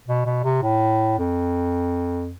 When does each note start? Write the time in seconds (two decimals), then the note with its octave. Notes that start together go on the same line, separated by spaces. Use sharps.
0.07 B2
0.26 B2
0.44 C3
0.63 A2
1.19 F2